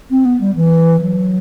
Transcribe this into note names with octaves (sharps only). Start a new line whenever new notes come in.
C4
B3
G3
E3
F#3